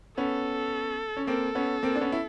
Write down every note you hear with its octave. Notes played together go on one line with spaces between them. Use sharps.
B3 C#4 A4
C#4
A#3 C4 A4
B3 C#4
A#3 C4
D4
B3 C#4
E4